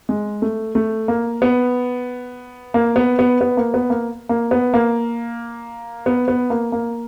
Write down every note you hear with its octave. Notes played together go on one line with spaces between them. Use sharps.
G#3
A3
A3
A#3
B3
A#3
B3
B3
B3
A#3
B3
A#3
A#3
B3
A#3
B3
B3
A#3
A#3